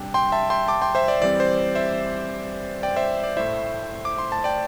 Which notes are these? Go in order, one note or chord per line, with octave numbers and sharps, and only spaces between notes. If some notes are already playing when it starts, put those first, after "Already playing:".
Already playing: C3 G3 D4 G5
G5 C6
E5 A5
G5 C6
A5 D6
G5 C6
C5 E5
D5
E3 G3 C4 D5
C5
C5 E5
D5 G5
C5 E5
D5
A2 A3 E4 C5 E5
D6
C6
A5
D5 G5